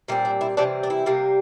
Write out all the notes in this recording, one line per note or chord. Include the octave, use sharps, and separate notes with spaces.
A#2 G3 C4 E4
D4
E4
C3 E3 G3 C4 D4
D4
E4
C3 G3 A#3